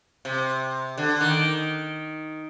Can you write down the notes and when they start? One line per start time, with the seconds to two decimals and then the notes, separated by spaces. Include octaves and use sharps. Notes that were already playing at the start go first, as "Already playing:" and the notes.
0.25 C3
0.98 D3
1.21 D#3